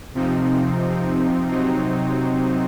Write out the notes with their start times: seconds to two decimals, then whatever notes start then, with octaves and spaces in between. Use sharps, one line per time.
0.15 C3 F3 C4 D#4
1.52 C3 F#3 C4 D#4